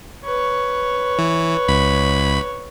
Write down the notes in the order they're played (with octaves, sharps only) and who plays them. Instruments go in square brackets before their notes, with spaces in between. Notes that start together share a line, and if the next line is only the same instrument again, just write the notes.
[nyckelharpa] B4 C#5
[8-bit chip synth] E3
C#2 B5